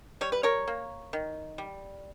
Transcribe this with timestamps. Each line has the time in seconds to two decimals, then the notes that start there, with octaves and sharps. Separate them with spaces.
0.21 G3 C#5
0.32 B4
0.43 A#4 C#5
0.68 A#3
1.13 D#3
1.58 G3